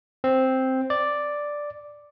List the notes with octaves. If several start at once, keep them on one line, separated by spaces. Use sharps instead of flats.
C4
D5